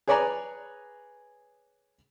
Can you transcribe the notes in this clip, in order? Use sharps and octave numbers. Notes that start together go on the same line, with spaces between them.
G#4 B4 C#5 D5 G#5 A#5